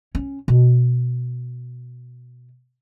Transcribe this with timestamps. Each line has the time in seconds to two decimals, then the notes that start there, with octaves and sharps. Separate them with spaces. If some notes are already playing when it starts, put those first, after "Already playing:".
0.15 C#4
0.48 B2